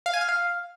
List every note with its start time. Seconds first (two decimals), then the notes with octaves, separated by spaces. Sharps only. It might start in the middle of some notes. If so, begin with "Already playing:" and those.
0.06 F5
0.13 G#5
0.21 F6
0.29 F5